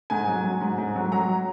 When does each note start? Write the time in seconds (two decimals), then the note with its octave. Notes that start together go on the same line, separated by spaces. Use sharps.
0.10 G#2 G#5
0.28 F#3
0.44 F#3
0.61 G#2
0.78 G#2
0.96 F#3
1.12 F#3 A#5